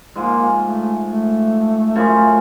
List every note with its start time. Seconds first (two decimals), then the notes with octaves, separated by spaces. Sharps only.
0.16 G#2 F3 G#3 A#3
0.61 A3
1.06 A3
1.95 F#2 C#3 F3